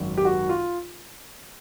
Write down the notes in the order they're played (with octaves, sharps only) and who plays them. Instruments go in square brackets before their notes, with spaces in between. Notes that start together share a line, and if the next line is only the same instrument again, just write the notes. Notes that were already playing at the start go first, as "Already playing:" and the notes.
Already playing: [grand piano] G#1 F#2 D#3 F#3
G4
F#4
F4